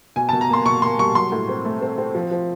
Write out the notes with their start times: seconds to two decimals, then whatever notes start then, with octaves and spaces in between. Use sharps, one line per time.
0.16 B2 G#5
0.29 B2 A5
0.41 A#5
0.49 A#3 C6
0.65 B2 C#6
0.82 A#3 C6
0.98 G3 C#6
1.15 F#3 C6
1.32 A2
1.49 C4
1.65 A3
1.82 C4
1.98 C4
2.15 F3
2.31 F3